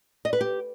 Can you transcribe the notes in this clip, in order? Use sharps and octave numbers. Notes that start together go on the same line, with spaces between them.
D#5
B4
G4